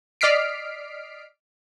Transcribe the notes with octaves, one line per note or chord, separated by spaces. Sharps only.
D5 D#5 F6 B6 C7 D7